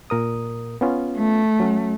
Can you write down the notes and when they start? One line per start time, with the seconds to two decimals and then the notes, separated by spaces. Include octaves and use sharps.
0.10 A#2 A#4 D#6
0.81 B3 C#4 F4
1.17 A3
1.60 F#3 C#4 F#4